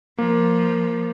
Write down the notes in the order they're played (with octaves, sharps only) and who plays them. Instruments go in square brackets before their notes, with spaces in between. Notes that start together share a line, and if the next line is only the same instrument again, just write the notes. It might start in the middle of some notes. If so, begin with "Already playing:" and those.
[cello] F3 [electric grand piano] A#3